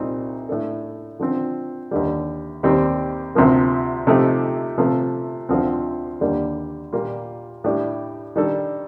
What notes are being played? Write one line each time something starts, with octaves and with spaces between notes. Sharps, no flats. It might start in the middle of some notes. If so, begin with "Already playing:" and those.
Already playing: C2 A#2 G3 C4 D#4
A2 A3 D4 A4
D3 F3 C4
D#2 D3 G3
D#2 D#3 G3 C4 G4
D2 C3 F3 A#3
C3 F3 A3 D#4 G4
C3 F3 A3
D2 D3 F3 C4
D#2 D3 G3 A#3 D4
A#2 G3 A#3 F4
A2 G3 D4 G4
D#3 G3 D4 A4